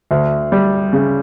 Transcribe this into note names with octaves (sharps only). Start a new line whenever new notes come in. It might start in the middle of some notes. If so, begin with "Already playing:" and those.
D2
G3
C#3